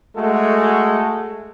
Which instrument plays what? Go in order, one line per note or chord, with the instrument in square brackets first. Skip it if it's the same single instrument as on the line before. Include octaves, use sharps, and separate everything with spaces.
[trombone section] G#3 A3 F#4 A4